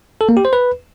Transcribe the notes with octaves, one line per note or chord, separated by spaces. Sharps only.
A4
A#3
G4
C5
B4